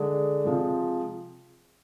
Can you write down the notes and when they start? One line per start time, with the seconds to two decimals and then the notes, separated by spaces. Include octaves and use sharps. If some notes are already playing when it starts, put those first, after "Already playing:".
Already playing: D3 G#3
0.45 C3 F3 G#3